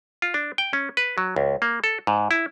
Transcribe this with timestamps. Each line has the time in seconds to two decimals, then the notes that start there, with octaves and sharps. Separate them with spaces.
0.22 F4
0.34 D4
0.58 G5
0.73 C#4
0.97 B4
1.18 F#3
1.36 C#2
1.62 A#3
1.84 A4
2.07 G#2
2.31 E4